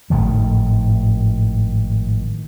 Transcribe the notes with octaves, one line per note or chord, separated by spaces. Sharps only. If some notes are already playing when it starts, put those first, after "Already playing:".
G#1 A2 D#3 F3